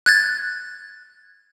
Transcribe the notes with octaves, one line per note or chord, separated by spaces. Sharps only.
F#6 G#6 A6